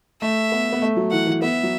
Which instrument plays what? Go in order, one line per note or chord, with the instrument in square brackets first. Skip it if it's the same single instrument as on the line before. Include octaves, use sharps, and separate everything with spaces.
[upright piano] A3 [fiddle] E5
[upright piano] B3
B3
A3
F#3
[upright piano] E3 [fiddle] F#5
[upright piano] E3
[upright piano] B3 [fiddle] E5
[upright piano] F#3